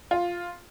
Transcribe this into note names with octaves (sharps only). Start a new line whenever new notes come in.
F4